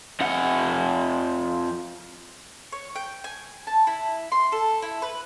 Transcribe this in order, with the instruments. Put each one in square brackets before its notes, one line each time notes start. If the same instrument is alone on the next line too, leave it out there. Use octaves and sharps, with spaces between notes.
[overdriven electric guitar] F2 F#5
[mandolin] C#5
G5
G#5
A5
E4
C6
A4
E4
B4